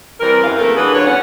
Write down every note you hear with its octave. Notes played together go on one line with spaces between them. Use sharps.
E3 G3 C4 A#4
F#2 E3 F5
C#3 A3 A#3 C4 A4 A#4
D3 E3 F#3 G#4 B4
A#2 D3 F#3 C#5
E2 B3 C#4 F#5